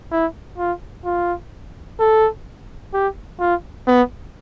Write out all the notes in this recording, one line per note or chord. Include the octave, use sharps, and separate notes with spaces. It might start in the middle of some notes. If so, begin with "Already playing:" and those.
E4
F4
F4
A4
G4
F4
B3